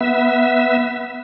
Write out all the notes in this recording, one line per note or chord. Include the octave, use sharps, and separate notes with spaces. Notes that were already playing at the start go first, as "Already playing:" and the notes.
B3 E5